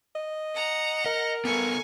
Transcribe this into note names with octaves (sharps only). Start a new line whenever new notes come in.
D#5
F#5 A#5
A#4 D#5
B3 A4 G#5 C#6